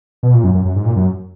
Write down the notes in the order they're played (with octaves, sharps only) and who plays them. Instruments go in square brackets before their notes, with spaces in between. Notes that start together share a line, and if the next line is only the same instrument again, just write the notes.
[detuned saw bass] B2
A#2
F#2
F#2
F#2
G#2
A#2
F#2